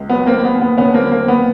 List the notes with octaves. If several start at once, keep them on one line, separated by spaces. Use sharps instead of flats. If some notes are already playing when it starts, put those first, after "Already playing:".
Already playing: C#2
F#3 B3
A#3 C4
D#2
B3
D#2
B3
D3 B3 C#4
A#3 C4
F#3
A#3 C4
D#2 B3